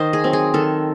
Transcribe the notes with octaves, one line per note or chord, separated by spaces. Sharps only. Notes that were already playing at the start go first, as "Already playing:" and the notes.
Already playing: D#3 C5 D#5
G#4
F#3 C4
G#4
D#3 A4